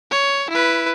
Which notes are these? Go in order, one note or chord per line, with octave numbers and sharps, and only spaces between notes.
C#5
E4 B4